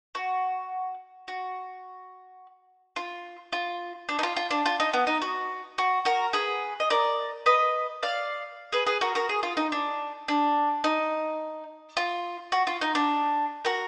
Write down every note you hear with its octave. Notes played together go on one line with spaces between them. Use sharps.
F#4
F#4
F4
F4
D4
D#4
F4
F4
D4
F4
D#4
B3
D#4
F#4
F#4
F#4 A#4
G#4 B4
D#5
A#4 D5
B4 D#5
D5 F5
G#4 B4
G#4 B4
F#4 A#4
F#4 A#4
G#4
F4
D#4
D4
D4
D#4
F4
F#4
F4
D#4
D4
F#4 A#4